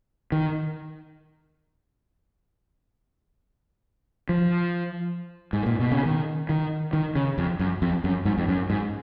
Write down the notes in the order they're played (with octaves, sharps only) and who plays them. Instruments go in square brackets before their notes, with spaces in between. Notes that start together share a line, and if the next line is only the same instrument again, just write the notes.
[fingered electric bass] D#3
F3
G#2
A#2
B2
C#3
D#3
D#3
D#3
C#3
F2
F#2
F2
F#2
G#2
F2
F#2
G#2